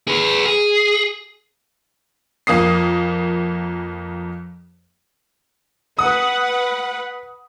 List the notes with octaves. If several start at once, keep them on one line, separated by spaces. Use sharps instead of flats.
G#4 B4
G#4
F2 A#3 D#6 C7
B4 F#5 D#6